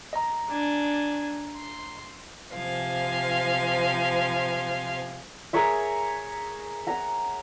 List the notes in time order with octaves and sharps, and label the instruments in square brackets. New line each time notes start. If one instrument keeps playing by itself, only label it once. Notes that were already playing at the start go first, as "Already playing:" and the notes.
[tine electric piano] D#5 A#5
[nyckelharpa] D4 G#5
C6
[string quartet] C3 F3 C5 F5 G#5
[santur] G#4 A#4 C#5 E5
F#5 A#5